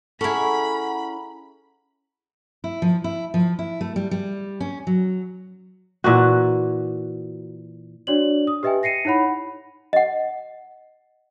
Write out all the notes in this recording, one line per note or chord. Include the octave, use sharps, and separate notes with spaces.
C#4 E4 G#4 A4 F#5 A#5 B5
E4
F3
E4
F3
E4
A3
G3
G3
C#4
F#3
A#2 E3 F#4
D4 F#4 C#5 D5 F#7
D#6
G4 B4 D#5 E5 G5 G#5
A#6 C7 C#7 D#7
D#4 E4 C#5 F#5 B5
D#5 F#5